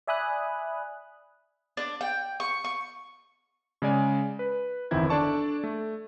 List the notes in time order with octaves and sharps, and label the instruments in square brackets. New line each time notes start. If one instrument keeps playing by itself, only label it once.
[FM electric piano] D5 E5 G#5 B5 D#6 F#6
[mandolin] D4
G5
C#6
C#6
[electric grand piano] C#3 G#3 D5 G#5
B4
G1 E2 D#3 C4 E4 G#6
D4 A4 D5 A5 C#6
A3